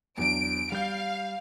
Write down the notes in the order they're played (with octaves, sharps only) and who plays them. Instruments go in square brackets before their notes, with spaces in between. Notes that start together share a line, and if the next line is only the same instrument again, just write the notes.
[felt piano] E2 F#3 D4 [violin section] D7
[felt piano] G3 G6 [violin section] F5